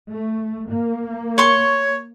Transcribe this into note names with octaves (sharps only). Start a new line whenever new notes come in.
A3
A#3
C#5 C6 C#6